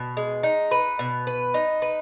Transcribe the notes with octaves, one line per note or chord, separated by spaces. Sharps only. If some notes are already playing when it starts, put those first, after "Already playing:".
Already playing: B2
G#3
D#4
B4
B2
B4
D#4
B4